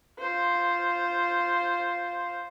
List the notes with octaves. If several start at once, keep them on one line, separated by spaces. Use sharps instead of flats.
F4 C5